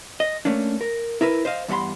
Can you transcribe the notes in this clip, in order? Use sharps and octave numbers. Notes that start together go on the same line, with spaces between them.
D#5
A3 A#3 C#4 D4
A#4
E4 A#4 B4 E5
C5 D#5 F5
E2 G2 F#5 B5 C6